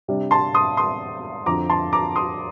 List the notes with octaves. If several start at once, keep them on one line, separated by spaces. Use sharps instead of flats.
C3 G3 D4
A5 C6
C6 D#6
C6 D#6
F2 D3 F3 A#5 D6
A5 C6
A#5 D6
C6 D#6